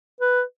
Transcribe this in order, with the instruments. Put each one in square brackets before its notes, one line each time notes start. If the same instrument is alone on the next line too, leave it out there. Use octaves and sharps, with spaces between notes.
[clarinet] B4